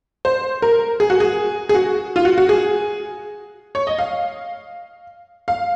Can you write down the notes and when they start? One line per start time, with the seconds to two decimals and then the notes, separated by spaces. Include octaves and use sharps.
0.25 C5
0.62 A#4
1.00 G#4
1.10 F#4
1.20 G#4
1.69 G#4
1.75 F#4
2.16 F4
2.25 F#4
2.38 F#4
2.49 G#4
3.75 C#5
3.87 D#5
3.99 F5
5.48 F5